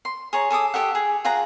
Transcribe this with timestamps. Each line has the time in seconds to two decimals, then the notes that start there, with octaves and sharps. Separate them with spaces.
0.05 C6
0.33 G#4 C#5 A#5
0.51 G#4 A4 D6 D#6
0.74 G4 A4 E5 F#5
0.95 G#4
1.24 F4 G#4 F#5 A#5